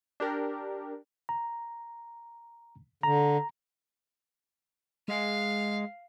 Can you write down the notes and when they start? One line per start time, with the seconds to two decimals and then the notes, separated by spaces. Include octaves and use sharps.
0.20 D4 G4 A#4
1.29 A#5
3.03 D3 A#5
5.08 G#3 F5